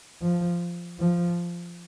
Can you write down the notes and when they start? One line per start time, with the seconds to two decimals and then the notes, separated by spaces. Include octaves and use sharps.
0.22 F3
0.99 F3